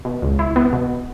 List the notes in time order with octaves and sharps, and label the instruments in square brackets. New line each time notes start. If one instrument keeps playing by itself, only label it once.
[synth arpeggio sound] B2
C#2
E4
B3
B2